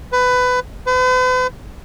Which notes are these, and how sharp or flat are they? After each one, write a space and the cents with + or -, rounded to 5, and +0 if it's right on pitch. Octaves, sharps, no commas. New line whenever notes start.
B4 +20
B4 +45